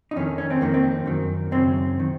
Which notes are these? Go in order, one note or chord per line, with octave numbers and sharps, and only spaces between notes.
D#4
F2 D#3 C#4
C#4
C4
F2 D#3 A#3
C4
F#2 D#3
F#2 C#3 C4
D#3